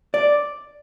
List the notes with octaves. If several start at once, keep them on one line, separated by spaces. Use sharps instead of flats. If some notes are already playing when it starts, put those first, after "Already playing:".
D5